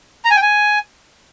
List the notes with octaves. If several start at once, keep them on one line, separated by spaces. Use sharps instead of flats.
A#5
G#5
G5
G#5